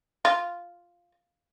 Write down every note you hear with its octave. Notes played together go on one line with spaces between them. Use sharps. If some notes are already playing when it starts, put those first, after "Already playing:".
F4